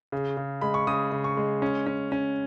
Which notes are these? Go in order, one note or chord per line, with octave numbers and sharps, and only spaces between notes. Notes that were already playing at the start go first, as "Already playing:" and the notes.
C#3
C#3
G#3 B5
C#6
C#3 D#6
C#3
C#6
G#3
C#4
C#4
C#4